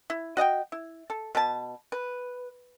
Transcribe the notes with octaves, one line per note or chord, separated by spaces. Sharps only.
E4
F#4 D#5 F#5 G5
E4
A4
B2 B4 A5
B4